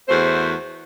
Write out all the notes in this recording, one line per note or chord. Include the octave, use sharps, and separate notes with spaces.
E2 A3 F#4 C5